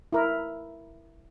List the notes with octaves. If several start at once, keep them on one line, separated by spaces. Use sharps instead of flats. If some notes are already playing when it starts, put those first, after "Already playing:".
E4 A#4